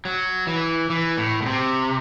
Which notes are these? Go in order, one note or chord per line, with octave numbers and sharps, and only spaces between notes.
F#3
E3
E3
A2
B2
C3